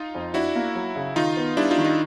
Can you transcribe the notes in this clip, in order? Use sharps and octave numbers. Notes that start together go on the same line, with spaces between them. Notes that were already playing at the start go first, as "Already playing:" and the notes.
Already playing: D#4 F4
F2
D4 E4 F#4
A#3
F#3
C#3
D#3 D#4 F4
B3
G3 D4 E4
D#4 F4
D#3
D#4 F4